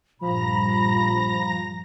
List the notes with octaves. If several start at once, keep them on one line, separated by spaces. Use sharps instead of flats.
A#1 G2 F3 A#5 B5 A#6